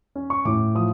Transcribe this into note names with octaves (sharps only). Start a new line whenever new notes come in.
C#4
C#6
A2 D6
F3 D#6